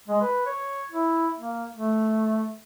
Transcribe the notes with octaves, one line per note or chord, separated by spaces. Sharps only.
G#3
B4
C#5
E4
A#3
A3